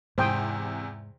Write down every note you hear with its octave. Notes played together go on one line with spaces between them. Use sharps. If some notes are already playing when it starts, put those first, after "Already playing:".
E2 G#2 C3 C5 G5 D#6